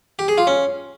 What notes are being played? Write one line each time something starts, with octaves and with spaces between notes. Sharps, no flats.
G4
G#4
F4
C#4